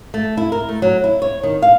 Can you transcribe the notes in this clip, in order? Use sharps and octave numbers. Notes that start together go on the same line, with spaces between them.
A3
E4
A#4
A3
F#3
E4
C#5
D#3
F5